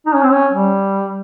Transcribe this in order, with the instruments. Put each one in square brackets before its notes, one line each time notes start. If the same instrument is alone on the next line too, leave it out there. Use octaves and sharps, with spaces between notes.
[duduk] D#4
C#4
C4
C#4
G3